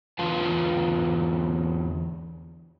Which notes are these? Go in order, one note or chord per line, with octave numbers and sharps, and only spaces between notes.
E2 D3 F4 B4 F5 A5